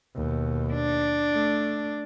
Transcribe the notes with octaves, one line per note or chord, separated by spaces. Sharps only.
D#2 B2
D4
A3